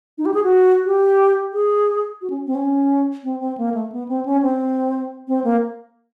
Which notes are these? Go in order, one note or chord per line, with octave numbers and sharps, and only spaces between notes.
D#4
G4
G#4
F#4
G4
G#4
F#4
C#4
C4
C#4
C4
C4
A#3
A3
B3
C4
C#4
C4
C4
A#3